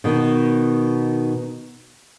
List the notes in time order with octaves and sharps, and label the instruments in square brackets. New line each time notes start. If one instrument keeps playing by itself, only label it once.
[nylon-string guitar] B2 D#3